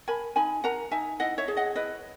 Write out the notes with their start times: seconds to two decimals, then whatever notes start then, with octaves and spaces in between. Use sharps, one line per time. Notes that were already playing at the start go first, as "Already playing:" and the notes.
0.08 A#4 G#5 B5
0.36 D#4 G#5 B5
0.64 A#4 F#5 A#5
0.91 D#4 E5 G#5
1.20 E4 D#5 F#5
1.38 C#5 E5
1.48 G#4
1.57 D#5 F#5
1.76 E4 B4 D#5